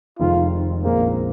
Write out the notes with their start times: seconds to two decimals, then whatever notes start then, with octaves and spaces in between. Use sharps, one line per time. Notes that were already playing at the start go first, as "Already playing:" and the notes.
0.19 F1 F2 D#3 G#3 C4 F4
0.84 A#1 A#2 G#3 A#3 C4